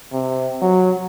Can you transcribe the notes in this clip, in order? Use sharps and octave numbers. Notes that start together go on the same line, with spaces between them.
C3
F#3